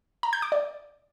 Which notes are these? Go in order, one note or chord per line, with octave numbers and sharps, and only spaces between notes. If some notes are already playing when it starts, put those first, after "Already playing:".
A#5
G6
D6
D5